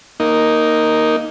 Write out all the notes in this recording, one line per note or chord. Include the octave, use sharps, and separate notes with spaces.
A#3 D#4